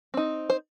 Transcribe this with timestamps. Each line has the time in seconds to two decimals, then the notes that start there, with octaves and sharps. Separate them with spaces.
0.14 C4 D#4
0.50 C5